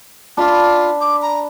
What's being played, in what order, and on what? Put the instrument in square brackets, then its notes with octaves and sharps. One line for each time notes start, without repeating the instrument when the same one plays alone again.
[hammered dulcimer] D4 B5 [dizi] F4
[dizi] D6
A#5